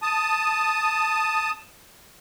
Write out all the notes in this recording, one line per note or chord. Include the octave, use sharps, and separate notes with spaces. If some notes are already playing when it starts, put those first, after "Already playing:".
A5 D#6